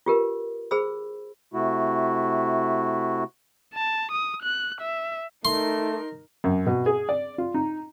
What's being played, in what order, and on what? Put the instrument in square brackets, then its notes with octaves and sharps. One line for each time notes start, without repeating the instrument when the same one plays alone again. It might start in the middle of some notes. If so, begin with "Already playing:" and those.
[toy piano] F4 G4 A#4 B4
G#4 C5 B5 E6
[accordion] C3 A3 E4 F#4
[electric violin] A5
D#6
F#6
E5
[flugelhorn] A3 [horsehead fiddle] D#4 A#4 [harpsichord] C6
[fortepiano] F#2
B2
G#4
D5
F4
D#4